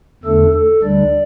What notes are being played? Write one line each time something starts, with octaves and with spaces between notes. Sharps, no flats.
E2 D3 A3 D4 A4
A4
D2 D3 G3 D4 D5